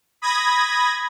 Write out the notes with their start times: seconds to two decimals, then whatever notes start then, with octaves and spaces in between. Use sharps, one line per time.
0.22 B5 D#6 G#6 A#6